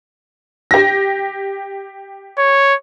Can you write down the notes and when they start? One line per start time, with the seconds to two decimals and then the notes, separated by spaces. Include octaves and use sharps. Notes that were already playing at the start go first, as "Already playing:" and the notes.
0.71 G4 A#6
2.38 C#5